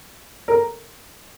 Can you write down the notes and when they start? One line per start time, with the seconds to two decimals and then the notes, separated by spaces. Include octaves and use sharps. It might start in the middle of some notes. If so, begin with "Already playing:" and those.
0.48 A#4